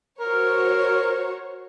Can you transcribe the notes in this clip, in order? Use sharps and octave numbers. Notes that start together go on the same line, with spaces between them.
F#4 A#4 C5 C#5